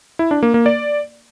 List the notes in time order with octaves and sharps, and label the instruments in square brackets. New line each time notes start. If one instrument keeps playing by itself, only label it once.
[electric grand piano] E4
D4
A#3
A#3
D5